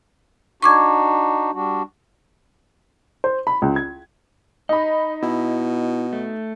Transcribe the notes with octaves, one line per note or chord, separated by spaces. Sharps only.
D4 D#4 F#4 C#6 D6 G#6
G3 D4 F#4
C5
B5
C#2
G#6
D#4 D#5 B5
B2 E4
A3